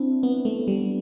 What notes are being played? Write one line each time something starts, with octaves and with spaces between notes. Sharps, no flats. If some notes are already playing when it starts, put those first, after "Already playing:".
Already playing: C4 D4 E4
B3
A3
G3